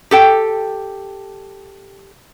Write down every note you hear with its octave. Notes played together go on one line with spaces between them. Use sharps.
G4 A4 G5